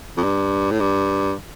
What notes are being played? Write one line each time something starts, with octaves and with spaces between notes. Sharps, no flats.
F2
G2
A2
G2